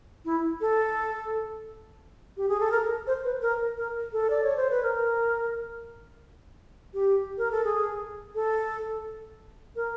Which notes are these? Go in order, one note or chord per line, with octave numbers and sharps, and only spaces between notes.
E4
A4
G4
G#4
A4
A#4
C5
B4
A#4
A#4
A4
D5
C#5
C5
B4
A#4
G4
A#4
A4
G#4
A4
A#4